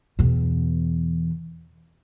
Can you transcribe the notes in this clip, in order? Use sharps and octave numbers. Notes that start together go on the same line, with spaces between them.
E2 B2